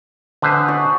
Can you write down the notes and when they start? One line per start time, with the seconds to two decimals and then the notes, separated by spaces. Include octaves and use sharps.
0.42 D3 B4 C5 D#5 G#5
0.68 F#4 D5